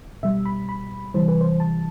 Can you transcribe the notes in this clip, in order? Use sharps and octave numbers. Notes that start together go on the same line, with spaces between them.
B2 G3 E5
B5
B5
C3 E3 G3 C5
B4
C5
A5